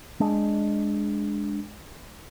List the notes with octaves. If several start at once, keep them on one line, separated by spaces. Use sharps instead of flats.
G#3 D4